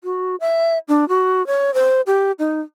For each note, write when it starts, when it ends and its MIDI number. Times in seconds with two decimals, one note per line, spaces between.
0.04 0.36 66
0.40 0.78 76
0.88 1.08 62
1.09 1.45 66
1.47 1.74 73
1.74 2.01 72
2.07 2.32 67
2.39 2.60 63